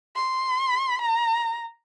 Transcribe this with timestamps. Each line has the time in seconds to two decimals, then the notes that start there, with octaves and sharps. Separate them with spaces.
0.15 C6
1.01 A#5